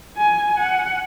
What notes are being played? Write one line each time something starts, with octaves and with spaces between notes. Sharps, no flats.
G#5
F#5